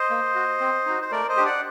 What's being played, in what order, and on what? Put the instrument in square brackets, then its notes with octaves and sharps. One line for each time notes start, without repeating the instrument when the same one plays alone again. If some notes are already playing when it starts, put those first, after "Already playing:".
Already playing: [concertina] C5 D#5
A#3
F#4
C4
D#4 F#4
C5
A3 A#4 D5
C5 D#5
D4 G4
D5 F#5